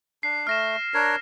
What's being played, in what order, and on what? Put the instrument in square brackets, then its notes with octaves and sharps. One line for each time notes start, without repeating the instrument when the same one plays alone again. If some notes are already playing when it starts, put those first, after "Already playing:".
[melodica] D4 [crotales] C7
[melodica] A3 [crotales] F6 A#6 E7
[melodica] D4 A#4 C#5